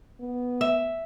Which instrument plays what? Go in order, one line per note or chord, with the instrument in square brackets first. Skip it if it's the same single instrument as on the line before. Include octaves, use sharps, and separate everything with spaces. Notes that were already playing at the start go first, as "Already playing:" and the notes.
[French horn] B3
[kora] E5